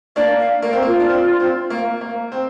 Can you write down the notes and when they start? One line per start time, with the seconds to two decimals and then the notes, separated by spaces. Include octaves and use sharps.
0.16 A#3 D4 D5
0.39 F5
0.62 A#3 A#4
0.73 C4
0.82 A#3
0.86 F4
1.00 D4
1.09 C4
1.40 C4
1.70 A#3
2.01 A#3
2.32 C4